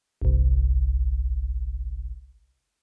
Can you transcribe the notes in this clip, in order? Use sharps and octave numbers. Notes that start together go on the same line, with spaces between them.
G1 C2